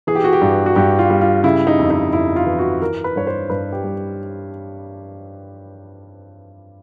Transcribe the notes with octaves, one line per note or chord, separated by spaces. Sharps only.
E3 G#4
G4
F#4
G4
G2
F#4
G2 G4
F4
G3
F4
C#3 E4
D#4
F2
D#4
F2 E4
F4
E3
F#4
E3 A#4
B4
G2 C#5
C5
G2 B4
G4
G3